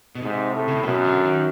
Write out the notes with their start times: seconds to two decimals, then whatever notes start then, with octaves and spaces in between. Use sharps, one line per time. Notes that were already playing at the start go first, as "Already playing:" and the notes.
0.15 B2
0.22 G#2 C3
0.53 A2
0.68 C#3
0.76 C3
0.83 F#2 B2
1.05 D3
1.25 D#3